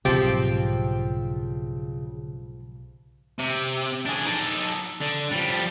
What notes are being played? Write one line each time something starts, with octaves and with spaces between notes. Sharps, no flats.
B1 G#2 C#3 F3 C4 G4
C3
D4 G#4
D#4 A4
D3
F3 G3